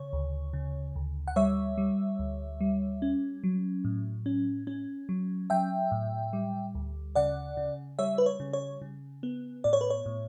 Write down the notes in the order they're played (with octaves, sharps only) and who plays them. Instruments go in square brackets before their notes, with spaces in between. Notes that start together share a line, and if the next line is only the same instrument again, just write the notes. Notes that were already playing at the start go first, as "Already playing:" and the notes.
Already playing: [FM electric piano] C#3 C#5
D2
C#3
D2
F#5
G3 C#5 E5
G3
D2
G3
C#4
F#3
A2
C#4
C#4
F#3
F#3 E5 G5
A2
G3
D2
C#3 D5 F#5
C#3
G3 C#5 E5
B4
C#5
C#3
C#5
C#3
B3
A2 D5
C#5
B4
C#5
A2